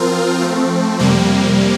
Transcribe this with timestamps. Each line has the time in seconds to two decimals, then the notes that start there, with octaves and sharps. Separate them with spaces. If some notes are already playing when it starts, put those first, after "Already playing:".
Already playing: F3 C4 F4 A#4
0.40 F3 A3 C4
0.99 F2 C3 G3 A#3